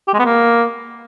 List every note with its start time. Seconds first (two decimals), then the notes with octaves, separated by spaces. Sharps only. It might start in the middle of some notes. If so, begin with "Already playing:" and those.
0.08 G4
0.14 G#3
0.19 B3
0.25 A#3